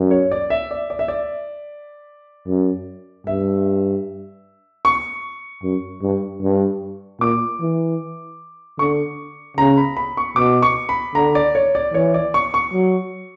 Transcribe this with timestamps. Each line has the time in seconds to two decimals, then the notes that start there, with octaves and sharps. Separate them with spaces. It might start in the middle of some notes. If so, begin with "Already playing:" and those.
Already playing: F#2
0.11 C#5
0.31 D5
0.50 E5
0.71 D5
0.90 D5
0.99 E5
1.08 D5
2.47 F#2
3.27 G2 E5
4.85 C#6
5.63 F#2
6.02 G2
6.43 G2
7.20 A#2 D6
7.61 E3
8.79 D3 C#6
9.57 C#3 A#5
9.77 B5
9.97 B5
10.17 C#6
10.36 B2 D6
10.62 C#6
10.89 B5
11.15 D3 A#5
11.35 D5
11.55 C#5
11.75 D5
11.94 E3 C#5
12.14 D5
12.34 C#6
12.54 C#6
12.73 F#3